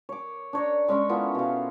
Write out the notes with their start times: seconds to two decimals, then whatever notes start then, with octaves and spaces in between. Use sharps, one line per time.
0.09 C#5 D6
0.53 D4 C#5 A#5
0.88 G#3 C#4 C#5 C#6
1.09 B3 E4 F4 A4
1.35 B2 F5